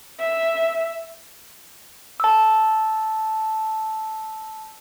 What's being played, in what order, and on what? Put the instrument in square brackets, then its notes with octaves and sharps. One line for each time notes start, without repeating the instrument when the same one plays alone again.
[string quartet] E5
[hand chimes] A5 E6